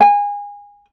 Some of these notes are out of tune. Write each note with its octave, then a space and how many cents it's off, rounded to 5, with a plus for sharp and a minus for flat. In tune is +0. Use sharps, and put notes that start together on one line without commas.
G#5 -25